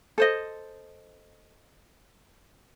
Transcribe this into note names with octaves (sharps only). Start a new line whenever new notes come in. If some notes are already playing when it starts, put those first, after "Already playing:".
A4 C5 D#5